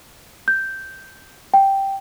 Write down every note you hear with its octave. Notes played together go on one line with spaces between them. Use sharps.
G6
G5